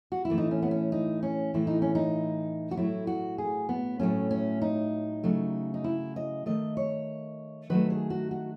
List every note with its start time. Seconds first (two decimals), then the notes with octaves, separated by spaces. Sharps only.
0.12 F#4
0.25 E4
0.30 A2 E3 A3
0.38 D#4
0.51 C#4
0.62 B3
0.71 C#4
0.92 D#4
1.23 C#4
1.54 A2 E3 A3 E4
1.67 D#4
1.82 C#4
1.95 D#4
2.71 F#4
2.76 A2 F#3 A3 E4
3.07 F#4
3.38 G#4
3.69 B3
3.99 A2 F#3 A3 C#4
4.31 C#4
4.62 D#4
5.24 C#3 F#3 A3
5.74 D#4
5.84 E4
6.16 D#5
6.46 D#3 A3 D#5
6.77 C#5
7.70 D#3 F#3 A3 B4
7.90 G#4
8.10 F#4
8.31 F#4